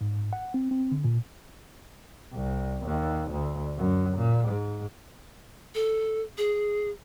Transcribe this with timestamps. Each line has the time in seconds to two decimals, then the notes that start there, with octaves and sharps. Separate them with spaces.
0.01 G#2
0.33 F#5
0.54 C4
0.71 C4
0.92 D3
1.04 A#2
2.34 C2
2.85 D#2
3.31 D2
3.78 F#2
4.17 A#2
4.49 G#2
5.75 A4
6.38 G#4